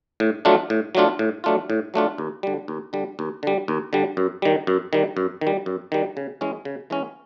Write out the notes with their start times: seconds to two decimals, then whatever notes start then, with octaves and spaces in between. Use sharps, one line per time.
0.20 A2
0.45 F#3 A3 D4 F4
0.70 A2
0.95 F#3 A3 D4 F4
1.19 A2
1.44 F#3 A3 D4 F4
1.70 A2
1.94 F#3 A3 D4 F4
2.18 D#2
2.43 D3 G3
2.68 D#2
2.93 D3 G3
3.19 D#2
3.43 D3 G3
3.68 D#2
3.93 D3 G3
4.17 F#2
4.42 D#3 G3
4.67 F#2
4.93 D#3 G3
5.17 F#2
5.41 D#3
5.47 G3
5.66 F#2
5.92 D#3 G3
6.17 C#3
6.41 E3 G#3 C#4
6.65 C#3
6.90 E3 G#3 C#4